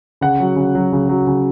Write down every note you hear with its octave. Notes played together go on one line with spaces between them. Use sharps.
C#3 F#5
F#3
C#3
F#3
C#3
F#3
C#3